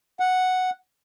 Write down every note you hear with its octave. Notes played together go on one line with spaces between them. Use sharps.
F#5